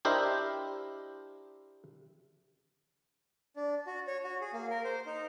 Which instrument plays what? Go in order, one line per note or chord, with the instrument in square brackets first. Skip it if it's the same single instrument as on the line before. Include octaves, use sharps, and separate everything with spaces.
[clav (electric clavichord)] D4 E4 G4 A#4 C5 D#5
[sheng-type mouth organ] D4
F#4
C#5
F#4
G#4
A#3
A#4
C5
D#4